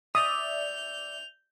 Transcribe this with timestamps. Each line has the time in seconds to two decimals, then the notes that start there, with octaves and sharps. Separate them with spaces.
0.15 D5 E5 D#6 G6 F7